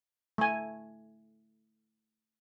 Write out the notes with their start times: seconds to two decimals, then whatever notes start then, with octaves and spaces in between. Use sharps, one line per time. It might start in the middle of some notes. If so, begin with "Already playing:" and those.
0.38 A3 G#5